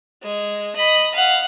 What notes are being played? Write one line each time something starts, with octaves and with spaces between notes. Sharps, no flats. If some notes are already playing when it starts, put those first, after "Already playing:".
G#3
D#5 B5
F5 F#5